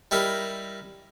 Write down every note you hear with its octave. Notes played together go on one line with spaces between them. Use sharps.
G3 D#4 E4 A#4